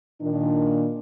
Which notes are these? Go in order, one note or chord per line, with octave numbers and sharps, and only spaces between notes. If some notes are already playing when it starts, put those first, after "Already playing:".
A#2 D#3 D4